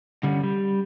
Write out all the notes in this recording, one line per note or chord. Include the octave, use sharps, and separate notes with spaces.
D3 G3 C#4
G3